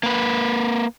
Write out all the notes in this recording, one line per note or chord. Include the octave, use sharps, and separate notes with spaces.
A#3 B4